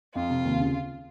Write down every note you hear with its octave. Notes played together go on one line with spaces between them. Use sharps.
F2 F4
C3
D#2
C#3